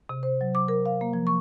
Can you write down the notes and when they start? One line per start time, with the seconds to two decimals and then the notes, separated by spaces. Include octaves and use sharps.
0.09 C3
0.23 C5
0.41 F#3
0.55 D6
0.68 A#4
0.86 F5
1.01 A#3
1.13 F3
1.27 C#6